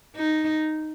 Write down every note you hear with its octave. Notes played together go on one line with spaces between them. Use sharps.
D#4